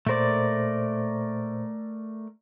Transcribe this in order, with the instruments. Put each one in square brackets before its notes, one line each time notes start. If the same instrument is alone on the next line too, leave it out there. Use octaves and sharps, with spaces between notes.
[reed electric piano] A#2 C5 [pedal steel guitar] A3 A#4 D5